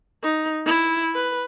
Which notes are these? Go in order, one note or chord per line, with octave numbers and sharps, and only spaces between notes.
D#4
E4
B4